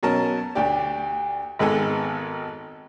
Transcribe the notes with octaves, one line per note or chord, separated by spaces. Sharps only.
B2 F#3 C#4 A#4 A5
D2 D4 G4 D5
G#1 D#3 G#3 B3 A4 G#5